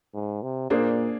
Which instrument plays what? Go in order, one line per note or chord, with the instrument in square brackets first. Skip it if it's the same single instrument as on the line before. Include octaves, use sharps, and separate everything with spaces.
[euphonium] G#2
C3
[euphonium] A#2 [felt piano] A#3 D4 G#4 C5